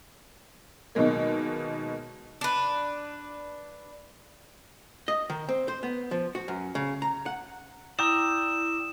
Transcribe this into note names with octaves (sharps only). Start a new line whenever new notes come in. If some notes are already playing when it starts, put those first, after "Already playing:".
B2 D#3 F#3 G#3 A#3
D4 B4
D#5
D#3
C4
C5
B3
F3
F#4
F#2
C#3
A#5
F#5
E4 D5 G5 A#5 D#6 E6 E7